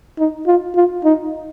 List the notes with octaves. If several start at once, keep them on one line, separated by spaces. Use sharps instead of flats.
D#4
F4
F4
D#4